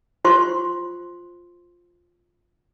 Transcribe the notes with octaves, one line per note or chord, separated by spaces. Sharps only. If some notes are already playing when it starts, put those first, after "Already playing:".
F4 C5 C6 C#6